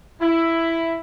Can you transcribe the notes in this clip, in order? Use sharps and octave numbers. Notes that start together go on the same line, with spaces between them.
E4